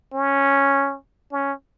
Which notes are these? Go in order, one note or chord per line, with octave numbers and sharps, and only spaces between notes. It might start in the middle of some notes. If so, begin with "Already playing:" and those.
C#4
C#4